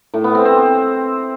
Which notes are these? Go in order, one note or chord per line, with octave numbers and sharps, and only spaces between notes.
A2
B3
C4
C4